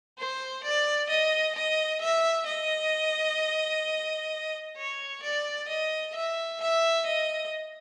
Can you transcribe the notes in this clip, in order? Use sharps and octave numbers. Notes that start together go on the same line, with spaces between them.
C5
D5
D#5
D#5
E5
D#5
C#5
D5
D#5
E5
E5
D#5